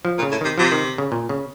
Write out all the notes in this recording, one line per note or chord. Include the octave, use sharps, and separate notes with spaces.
F3
A#2
C#3
A2
C3 D#3
C3 F3
D#3
C#3
A#2
C#3